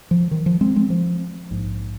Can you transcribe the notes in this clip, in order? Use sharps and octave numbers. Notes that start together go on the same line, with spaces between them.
F3
D#3
F3
G#3 C4
G#3 C4
F3
A#1 G#2